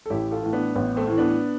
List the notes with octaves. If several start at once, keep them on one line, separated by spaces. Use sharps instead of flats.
A4
A1 E4 G4
F4 A4
A2 E3
B3 D4
A1 B3
A3 C4
A2 E3
B3 D4